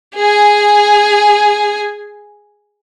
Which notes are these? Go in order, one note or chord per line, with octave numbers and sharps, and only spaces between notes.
G#4 G#5